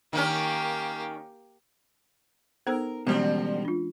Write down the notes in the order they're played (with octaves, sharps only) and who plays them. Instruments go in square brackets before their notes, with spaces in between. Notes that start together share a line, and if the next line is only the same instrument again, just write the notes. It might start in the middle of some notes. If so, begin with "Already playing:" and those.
[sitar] D#3 C#4 [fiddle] A#3 G4
[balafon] B3 A4 C5 [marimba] D#4 E6 [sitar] A#4
[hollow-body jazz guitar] B2 G3 [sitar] D3 F3 C4 [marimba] E3 G#3 C#4
[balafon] D4 F4